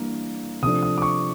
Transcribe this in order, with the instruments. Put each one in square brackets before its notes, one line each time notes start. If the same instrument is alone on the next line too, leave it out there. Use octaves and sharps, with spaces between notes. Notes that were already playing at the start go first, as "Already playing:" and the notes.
Already playing: [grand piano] E3 G3 A#3 D4
C3 F3 A3 D4 D#6
D#6
D6
C#6